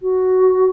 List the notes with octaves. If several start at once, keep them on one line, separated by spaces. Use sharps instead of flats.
F#4